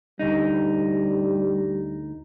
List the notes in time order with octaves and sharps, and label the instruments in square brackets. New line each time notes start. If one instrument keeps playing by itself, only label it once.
[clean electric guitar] D2 D#4 [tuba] G3